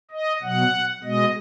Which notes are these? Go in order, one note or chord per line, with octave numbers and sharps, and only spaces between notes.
D#5
B2 F#3 F#5
B2 G#3 D#5